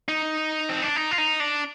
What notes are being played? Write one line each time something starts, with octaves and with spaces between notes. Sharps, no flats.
D#4
C4
D4
D#4
F4
D#4
D4